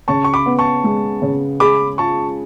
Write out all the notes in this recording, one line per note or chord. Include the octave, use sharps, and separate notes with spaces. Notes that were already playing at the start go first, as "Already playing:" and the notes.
C#3 A5 C#6
C#6
B5 D6
B3
A5 C#6
G#3
C#3
G#4 B5 D6
F4 A5 C#6